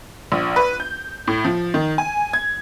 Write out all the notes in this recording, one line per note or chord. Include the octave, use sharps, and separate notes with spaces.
A#1
B4
G6
A2
F3
D#3
G#5
G#6